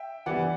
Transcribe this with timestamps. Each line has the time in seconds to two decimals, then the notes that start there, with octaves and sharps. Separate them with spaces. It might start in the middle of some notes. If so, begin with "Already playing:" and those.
Already playing: E5 G5
0.26 E3 G3 B3 D5 F#5